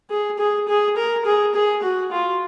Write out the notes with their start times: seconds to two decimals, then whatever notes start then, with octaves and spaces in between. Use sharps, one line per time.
0.10 G#4
0.38 G#4
0.68 G#4
0.97 A#4
1.25 G#4
1.55 G#4
1.83 F#4
2.11 F4